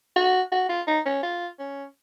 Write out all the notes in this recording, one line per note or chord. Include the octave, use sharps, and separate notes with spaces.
F#4
F#4
F4
D#4
C#4
F4
C#4